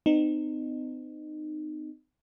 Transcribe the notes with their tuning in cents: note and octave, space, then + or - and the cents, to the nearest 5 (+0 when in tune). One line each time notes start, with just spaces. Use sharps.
C4 -45 D#4 -25